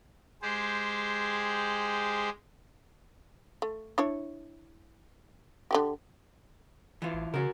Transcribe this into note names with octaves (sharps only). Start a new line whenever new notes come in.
G#3 G4 G#4 C5
A3
D4 E4 C#5
D3 E3 G4
E3 F4
A1
C#3 F#4 A#4